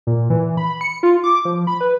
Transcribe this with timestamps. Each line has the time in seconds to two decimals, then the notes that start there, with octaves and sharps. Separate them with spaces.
0.07 A#2
0.30 E3
0.57 B5
0.81 C#7
1.03 F4
1.24 D6
1.45 F3
1.67 B5
1.81 B4